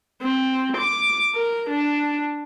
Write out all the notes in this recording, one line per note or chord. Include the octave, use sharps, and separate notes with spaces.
C4
D6
A#4
D4